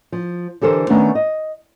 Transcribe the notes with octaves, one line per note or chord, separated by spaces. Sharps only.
F3
D3 E3 G4 A4 A#4 C5
D#3 A3 B3 C#4 D4
D#5